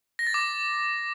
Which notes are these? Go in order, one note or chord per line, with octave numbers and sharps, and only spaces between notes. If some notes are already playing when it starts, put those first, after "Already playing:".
A#6
A6
D6